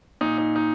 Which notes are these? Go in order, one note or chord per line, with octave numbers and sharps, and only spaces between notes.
A#2 D#4
D#4
D#4